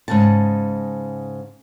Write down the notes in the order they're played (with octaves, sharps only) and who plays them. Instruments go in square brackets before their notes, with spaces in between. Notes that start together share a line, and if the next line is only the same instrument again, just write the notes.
[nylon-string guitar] G#2 C#3 A5